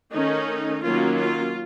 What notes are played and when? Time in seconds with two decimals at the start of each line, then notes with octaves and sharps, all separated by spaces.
0.12 D#3 A3 C#4 D#4
0.82 D#3 F#3 A#3 C#4 F4
1.18 F4